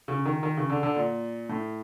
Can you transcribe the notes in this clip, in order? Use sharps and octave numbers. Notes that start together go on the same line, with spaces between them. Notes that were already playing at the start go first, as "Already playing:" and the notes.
C#3
D#3
D#3
C#3
D3
D3
A#2
A2